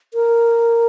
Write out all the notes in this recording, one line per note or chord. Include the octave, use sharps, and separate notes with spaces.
A#4